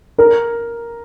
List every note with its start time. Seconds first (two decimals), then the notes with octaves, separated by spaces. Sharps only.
0.18 A#4